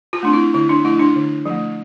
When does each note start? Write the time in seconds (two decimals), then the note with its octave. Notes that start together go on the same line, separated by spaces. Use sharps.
0.13 F4
0.23 A3 C4 D4
0.33 E4
0.54 D3 E4
0.69 D4
0.84 F3 A3 E4
1.00 D4
1.16 D3
1.46 F3 A3